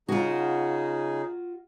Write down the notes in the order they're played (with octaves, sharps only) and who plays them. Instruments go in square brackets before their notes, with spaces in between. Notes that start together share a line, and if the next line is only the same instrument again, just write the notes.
[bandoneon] C#3 D#4 G#4 [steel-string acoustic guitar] F4 F#4